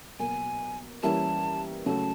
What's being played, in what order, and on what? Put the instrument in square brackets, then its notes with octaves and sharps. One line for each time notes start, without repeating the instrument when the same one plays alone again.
[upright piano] B2 F#3 A#3 [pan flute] G#5
[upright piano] E3 G3 A#3 C#4 E4 [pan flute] A5
[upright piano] C#3 F#3 A3 [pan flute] A5